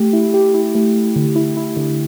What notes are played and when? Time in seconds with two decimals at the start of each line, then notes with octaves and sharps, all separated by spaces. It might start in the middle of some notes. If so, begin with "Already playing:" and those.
Already playing: A3 G4
0.13 E4
0.34 G4
0.54 E4
0.75 A3
0.95 A3
1.16 D3
1.36 E4
1.57 E4
1.77 D3